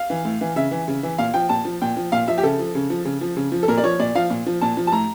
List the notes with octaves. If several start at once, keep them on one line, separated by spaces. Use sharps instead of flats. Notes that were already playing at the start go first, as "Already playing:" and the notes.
Already playing: F5
E3
A2
E3
C#3 E5
E3
C#3
E3
A#2 F5
F3 G5
A#2 A5
F3
A#2 G5
F3
A#2 F5
F3 E5
G4
C#3 A4
F3
C#3
F3
C#3
F3
C#3
F3
A4
A#2 A#4
D5
F3 C#5
A#2 D5
F3 F5
A#2
F3
A#2 A5
F3
A5
A2 A#5